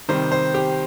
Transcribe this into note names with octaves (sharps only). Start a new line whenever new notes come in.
C3 D#3 G3 C5
C5
G4